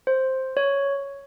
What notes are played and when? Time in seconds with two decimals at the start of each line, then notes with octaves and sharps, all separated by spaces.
0.07 C5
0.57 C#5